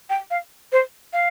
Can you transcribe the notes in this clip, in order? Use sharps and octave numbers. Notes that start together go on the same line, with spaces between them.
G5
F5
C5
F5